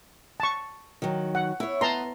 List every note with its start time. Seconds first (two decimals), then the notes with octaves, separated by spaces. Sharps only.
0.40 A5 C#6
1.02 D#3 F#3
1.35 F#5
1.60 E4 C#5
1.81 B3 A5 A#5 C6